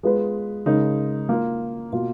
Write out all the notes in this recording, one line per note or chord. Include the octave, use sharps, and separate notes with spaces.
G#3 B3 F4 G#4 B4
C#3 G#3 D#4 A#4
A#3 F4 A#4
B2 A#3 F4 A#4